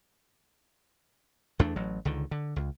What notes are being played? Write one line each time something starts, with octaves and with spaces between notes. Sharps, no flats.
E2 A3 D4
A1 F#3
C#2 D3 D#3
D3
C#2